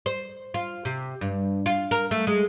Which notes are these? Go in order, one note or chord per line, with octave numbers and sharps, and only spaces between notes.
C5
F4
C3
G2
F4
A#4
A3
G#3